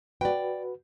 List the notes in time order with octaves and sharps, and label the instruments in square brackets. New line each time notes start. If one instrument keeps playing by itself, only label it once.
[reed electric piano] F#4 B4 [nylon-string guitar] D5 G5